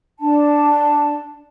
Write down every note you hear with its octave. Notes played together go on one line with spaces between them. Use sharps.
D4 A5